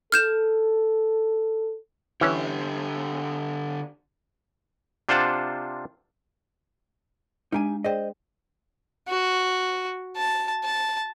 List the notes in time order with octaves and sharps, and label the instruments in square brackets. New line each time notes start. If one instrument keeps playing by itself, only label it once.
[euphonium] A4 [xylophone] F6 G6 E7
[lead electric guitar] D3 G4 [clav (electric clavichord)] E3 C#4
[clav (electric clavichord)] C3 D4 F4 C5 F#5 A5
[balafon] G#3 D4 [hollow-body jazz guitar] D#4 G4 G#5
[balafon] G#4 D5 G5 [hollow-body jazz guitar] C5 D#5
[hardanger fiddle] F#4
A5
A5